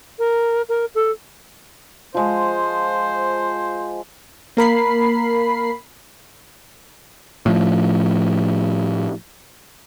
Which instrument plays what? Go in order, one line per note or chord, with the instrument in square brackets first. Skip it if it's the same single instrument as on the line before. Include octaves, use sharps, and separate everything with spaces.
[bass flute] A#4
A#4
A4
[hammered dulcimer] F3 G#3 [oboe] C5
[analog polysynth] A#3 A#4 B5 C7
[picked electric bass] A2 F3